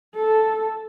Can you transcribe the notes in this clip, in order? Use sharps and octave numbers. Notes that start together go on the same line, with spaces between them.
A4